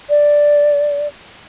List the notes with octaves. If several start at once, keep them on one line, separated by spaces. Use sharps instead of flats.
D5